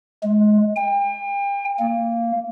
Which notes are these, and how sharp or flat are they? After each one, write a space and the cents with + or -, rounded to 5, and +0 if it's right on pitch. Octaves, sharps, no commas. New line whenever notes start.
G#3 +25
G5 +40
A#3 -10